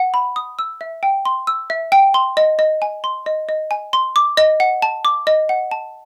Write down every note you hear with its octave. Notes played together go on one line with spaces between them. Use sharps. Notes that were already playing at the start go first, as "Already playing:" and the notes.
Already playing: F#5
B5
D#6
E6
E5
G5
C6
E6
E5
G5
C6
D#5
D#5
G#5
C6
D#5
D#5
G#5
C6
D6
D#5
F#5
A5
D6
D#5
F#5
A5